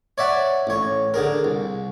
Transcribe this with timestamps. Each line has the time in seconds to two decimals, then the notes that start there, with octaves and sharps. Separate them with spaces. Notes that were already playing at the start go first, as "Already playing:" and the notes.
0.18 C#5 D5 E5 F#5
0.67 A1 C#5
1.14 D3 G#4 A#4
1.44 C2